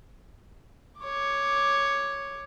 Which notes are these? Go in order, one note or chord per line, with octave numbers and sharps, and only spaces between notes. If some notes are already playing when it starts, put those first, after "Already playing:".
C#5 D6